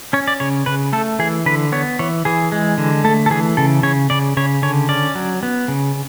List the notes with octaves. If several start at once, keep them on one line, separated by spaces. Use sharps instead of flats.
C#4 C#5
D5
C#3 C#5
C#3 B4
A3 A4
E3 G#4
D3 B4
B3 C#5
E3 C#5
E3 G#4
G#3
D3
A3 A4
A4
E3 G#4
C#3 A4
C#3 C#5
C#3 D5
C#3 C#5
D3 C#5
C#4 D5
F#3
B3
C#3